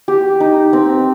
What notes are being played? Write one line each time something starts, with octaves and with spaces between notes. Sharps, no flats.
G4
D#4
C4